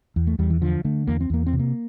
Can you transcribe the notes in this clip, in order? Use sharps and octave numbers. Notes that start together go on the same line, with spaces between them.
E2
A3
E2 G3
E3
D3 F3
D3 A3
E2 A#3
C4
E2 A#3
C4
C3
A#3